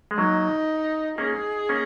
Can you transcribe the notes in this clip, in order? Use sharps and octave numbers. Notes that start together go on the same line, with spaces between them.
G#3
F#3 A#3 D#4
A#3 C#4 G#4
A#3 C#4